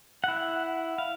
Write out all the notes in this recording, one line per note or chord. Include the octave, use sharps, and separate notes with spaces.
E4 F#5
F5